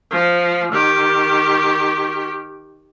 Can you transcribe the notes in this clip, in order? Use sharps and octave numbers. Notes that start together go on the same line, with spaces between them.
F3
D#3 G4